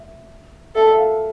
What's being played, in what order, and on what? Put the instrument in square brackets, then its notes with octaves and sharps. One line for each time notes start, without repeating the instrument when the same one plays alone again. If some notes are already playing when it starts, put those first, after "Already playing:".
Already playing: [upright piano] E5
[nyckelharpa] A4 [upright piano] E5
[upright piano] E5
F5